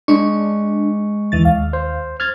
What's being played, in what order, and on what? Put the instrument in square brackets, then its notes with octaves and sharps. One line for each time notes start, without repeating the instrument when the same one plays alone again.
[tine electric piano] G#3 G#4 C#6 [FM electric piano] D4
[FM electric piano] D#2 E3 A6
D#2 F5
[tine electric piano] C5
F6 G#6 A6